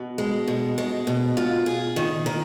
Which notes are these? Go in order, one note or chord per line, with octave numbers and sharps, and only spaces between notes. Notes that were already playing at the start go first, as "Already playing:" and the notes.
Already playing: B2
G#3
B2
G#3
B2
F4
G#4
D#3
D#3